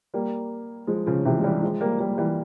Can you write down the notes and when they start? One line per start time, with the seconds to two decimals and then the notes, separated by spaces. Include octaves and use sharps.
0.14 G3 A#3
0.87 F3 G#3
1.06 C#3 F3
1.25 C3 E3
1.38 G#3
1.44 E3 G3
1.62 F3 G#3
1.81 G3 A#3
1.99 G3 A#3
2.18 E3 G3